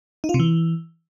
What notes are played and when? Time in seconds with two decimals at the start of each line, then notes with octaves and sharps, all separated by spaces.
0.24 D#4
0.29 F4
0.34 C3
0.40 E3